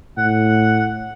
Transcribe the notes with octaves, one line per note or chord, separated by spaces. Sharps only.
A2 F#5